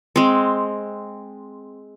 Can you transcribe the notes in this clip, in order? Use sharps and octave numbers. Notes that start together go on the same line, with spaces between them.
G#3 C4